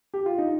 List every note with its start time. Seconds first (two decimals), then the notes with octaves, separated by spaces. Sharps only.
0.14 G4
0.26 F4
0.38 D#4